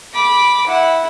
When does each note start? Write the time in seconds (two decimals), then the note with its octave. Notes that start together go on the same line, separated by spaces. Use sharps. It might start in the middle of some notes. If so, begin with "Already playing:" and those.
0.14 B5 D6
0.67 E4 F#5